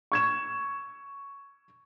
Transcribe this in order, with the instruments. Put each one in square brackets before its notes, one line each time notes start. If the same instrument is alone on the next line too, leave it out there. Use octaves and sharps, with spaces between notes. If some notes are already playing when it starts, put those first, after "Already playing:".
[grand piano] C#6 G#6 E7